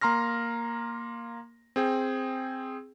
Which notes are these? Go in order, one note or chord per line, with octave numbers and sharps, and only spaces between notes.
A#3 A#5 C6 F6 A#6
C4 G#4 G5